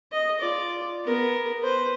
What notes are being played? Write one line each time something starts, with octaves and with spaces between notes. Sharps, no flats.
D#5
F4 D5
B3 A#4
B4 C5